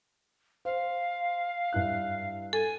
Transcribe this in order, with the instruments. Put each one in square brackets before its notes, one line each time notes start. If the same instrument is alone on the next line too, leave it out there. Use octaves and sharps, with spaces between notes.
[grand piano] C5 [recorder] F5
[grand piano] G2 E4 F#6
[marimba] A4 [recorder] G#5